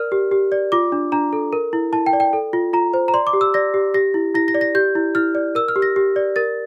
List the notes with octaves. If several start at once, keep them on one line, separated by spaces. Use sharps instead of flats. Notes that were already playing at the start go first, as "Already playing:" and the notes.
Already playing: A#4 D5 F6
G4
G4
D5
F4 D6
D4
D4 A#5
A4
A#4
E4
E4 A5
G5
D5
G5
A4
F4
F4 A#5
C5
A#5
D5 C6
D6
G4
E6
D5 A#6
G4
G4 A#6
E4
E4 A#6
A#6
D5
A#6
G4 G6
E4
E4 F6
D5
A#4 E6
F6
G4
A#6
G4
D5
A#4 A6